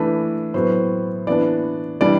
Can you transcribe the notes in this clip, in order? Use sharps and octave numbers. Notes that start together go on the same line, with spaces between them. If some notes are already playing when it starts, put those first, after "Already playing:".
Already playing: E3 A3 D4 B4
A2 F#3 B3 C5
E3 B3 D4 D5
E3 G3 D4 D5